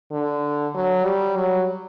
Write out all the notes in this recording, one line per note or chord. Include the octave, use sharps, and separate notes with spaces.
D3
F#3
G3
F#3